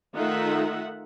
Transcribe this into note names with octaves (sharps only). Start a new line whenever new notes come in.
D#3 A3 D#4 F4 E5 F#5